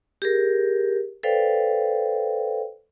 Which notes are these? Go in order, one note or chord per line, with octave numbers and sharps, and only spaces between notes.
G4 G#4 A#4
A4 B4 C5 D5 F5 G5